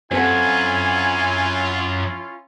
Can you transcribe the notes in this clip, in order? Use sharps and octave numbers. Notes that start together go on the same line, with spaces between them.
F#2 C4 C#4 E4 F4 A4 F#5 G#5